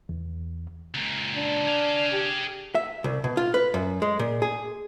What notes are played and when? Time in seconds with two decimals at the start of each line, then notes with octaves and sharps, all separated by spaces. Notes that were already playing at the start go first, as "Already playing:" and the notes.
0.09 E2
0.94 C#2 A#2
1.34 D4
1.67 G#4 F5
2.11 G4
2.75 E5
3.04 C2
3.24 B2
3.37 F4
3.54 B4
3.74 F#2
4.02 G#3
4.19 A#2
4.42 G#4